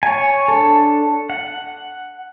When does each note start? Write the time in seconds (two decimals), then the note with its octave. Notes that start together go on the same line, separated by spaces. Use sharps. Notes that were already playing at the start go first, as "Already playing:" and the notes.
0.03 C#5 G#5
0.48 D4 A4
1.30 F#5